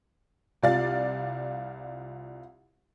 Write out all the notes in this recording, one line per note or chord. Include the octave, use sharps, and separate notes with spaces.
C2 F4 D5 F5 A6